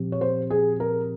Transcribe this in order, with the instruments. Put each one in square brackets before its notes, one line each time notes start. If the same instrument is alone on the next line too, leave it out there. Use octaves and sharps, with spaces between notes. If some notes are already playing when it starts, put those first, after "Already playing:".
Already playing: [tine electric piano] A#2 F3 C4 G4
[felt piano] C#5
C5
G#4
A#4